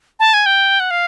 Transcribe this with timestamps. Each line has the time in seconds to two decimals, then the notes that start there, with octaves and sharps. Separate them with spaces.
0.20 A5
0.34 G#5
0.46 G5
0.80 F#5
0.91 F5